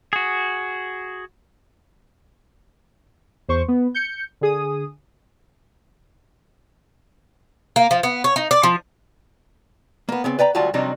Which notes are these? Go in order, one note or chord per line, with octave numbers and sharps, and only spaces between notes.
F#4 G#4
E2 C5 C#6
B3
G6 C#7
D3 G#4 D#6
A#3
F3
B3
C#5
D#4
D5
F3
A#3 B3
C#3 B3 C4
B4 D5 G5 A#5
D2 F#3 G3 F4 F#4 A5
F2 C3 F#3 G3 D4 D#4